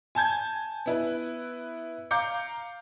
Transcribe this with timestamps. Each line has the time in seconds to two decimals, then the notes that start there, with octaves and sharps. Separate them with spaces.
0.15 G#5 A5 G6 G#6
0.86 B3 E4 B4
2.11 F5 A#5 D6 G6 C#7